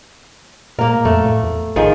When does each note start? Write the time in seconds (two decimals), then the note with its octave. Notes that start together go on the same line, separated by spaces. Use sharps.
0.79 A#2 A#3 A#4
1.05 F2 A3
1.25 A2
1.43 E2
1.76 A1 D#3 F3 G#4